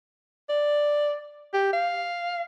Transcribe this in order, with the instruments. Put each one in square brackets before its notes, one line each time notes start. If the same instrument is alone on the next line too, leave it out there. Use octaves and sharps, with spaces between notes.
[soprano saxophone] D5
G4
F5